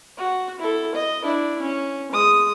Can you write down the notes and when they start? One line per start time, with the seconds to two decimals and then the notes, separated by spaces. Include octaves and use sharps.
0.17 F#4
0.59 E4 A4
0.95 D#5
1.23 D4 E4
1.61 C#4
2.12 G#3 D#6